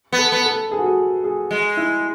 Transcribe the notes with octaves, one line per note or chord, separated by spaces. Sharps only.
B3
A4
B3
A4
G#4
F#4
G#4
G#4
G#3
E4